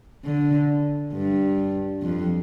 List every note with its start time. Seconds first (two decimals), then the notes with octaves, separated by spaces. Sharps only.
0.25 D3
1.13 G2
2.02 F2